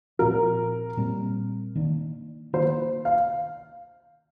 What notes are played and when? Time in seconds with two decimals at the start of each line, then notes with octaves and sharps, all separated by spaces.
0.19 A#2 F3 C4 A#4
0.97 A#2 G3 C4
1.75 D#3 A#3 D4
2.53 D#3 A#3 D4 C5
3.05 F5